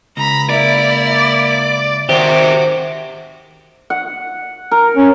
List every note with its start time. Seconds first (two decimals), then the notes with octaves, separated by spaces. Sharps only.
0.17 C#2 A#5 B5
0.50 A#3 E4 D5
2.09 C3 D#3 C4 F#4 G4 D6
3.90 F#5
4.71 A#4
4.97 C#4